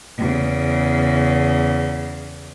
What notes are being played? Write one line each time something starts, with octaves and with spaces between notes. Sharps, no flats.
E2 C#3